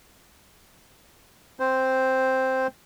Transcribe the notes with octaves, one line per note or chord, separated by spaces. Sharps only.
C4 C5